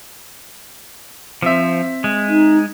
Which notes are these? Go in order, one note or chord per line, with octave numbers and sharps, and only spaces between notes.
F3 C4 E5
G#3
D#4